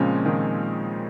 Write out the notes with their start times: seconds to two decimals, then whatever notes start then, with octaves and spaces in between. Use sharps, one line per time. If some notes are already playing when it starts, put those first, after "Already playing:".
Already playing: A#2 C#3 F3 G#3 C4 C#4
0.25 D#3 D#4